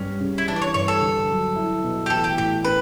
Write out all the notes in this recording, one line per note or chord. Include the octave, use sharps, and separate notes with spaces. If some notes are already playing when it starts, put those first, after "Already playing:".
Already playing: G2 G3 C#4
C#3
E4
E3 D4
D5
C#5
G2 C#5
A4
D3
F#3
E4
B2
G4
A1 A4
G4
A2 G4
D4 B4